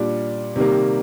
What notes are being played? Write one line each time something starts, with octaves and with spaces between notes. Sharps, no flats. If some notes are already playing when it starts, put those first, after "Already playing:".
Already playing: A#2 G3 D4
C3 D#3 G3 A#3